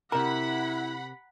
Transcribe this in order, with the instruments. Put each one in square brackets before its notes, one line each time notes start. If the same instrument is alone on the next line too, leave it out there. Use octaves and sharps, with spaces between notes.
[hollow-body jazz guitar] C3 A#4 [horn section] E4 [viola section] F#5 B5 [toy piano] A#5